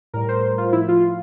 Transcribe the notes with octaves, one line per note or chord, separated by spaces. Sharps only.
A2 G3 A#4
C5
F4
A2 F3 E4
F4